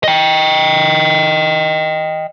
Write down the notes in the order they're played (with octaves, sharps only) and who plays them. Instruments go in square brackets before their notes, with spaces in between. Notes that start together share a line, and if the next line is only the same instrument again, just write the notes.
[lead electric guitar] D#5 G5